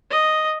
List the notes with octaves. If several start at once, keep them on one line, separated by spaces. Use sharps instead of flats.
D#5